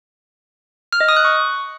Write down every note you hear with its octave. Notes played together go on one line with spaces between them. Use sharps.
F6
D#5
D#6
F#6
C#6